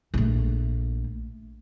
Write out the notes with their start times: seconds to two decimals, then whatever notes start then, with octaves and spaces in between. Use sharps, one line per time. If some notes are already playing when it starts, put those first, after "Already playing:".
0.14 A#1 A3